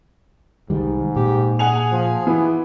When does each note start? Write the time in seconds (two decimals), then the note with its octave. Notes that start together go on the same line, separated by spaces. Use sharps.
0.70 C2 G#2 D#3 G3
1.16 A#2 G4
1.59 G#4 F#5 G#5 F7
1.92 F3
2.27 E3 B3